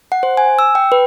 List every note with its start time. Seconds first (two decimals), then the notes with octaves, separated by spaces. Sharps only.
0.12 F#5
0.23 C5
0.37 G#5
0.59 E6
0.75 G5
0.92 B4